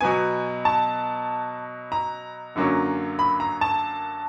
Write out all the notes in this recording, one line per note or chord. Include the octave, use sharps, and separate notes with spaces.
B2 F#3 B3 G#5
A5
A#5
F#2 D3 F#3 A#3 C#4
B5
A#5
A5